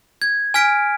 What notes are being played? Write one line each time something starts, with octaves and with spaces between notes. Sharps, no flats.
G#6
G#5 F6 B6 D7